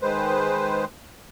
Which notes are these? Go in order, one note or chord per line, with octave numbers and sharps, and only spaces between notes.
D#3 G#3 B4 C5